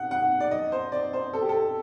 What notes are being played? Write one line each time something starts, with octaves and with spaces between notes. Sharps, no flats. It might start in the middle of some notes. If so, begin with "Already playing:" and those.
Already playing: F#5
F#5
D5
D#5
C5
D5
C5
A4
G4
A4